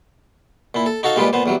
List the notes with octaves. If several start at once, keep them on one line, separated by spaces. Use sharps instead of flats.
A#2 E4
A4
D#4 F#4 A4 F5
A#2 G3 G#3 F4 G4 B4
A#2 B3 C5
E2 F#3 G3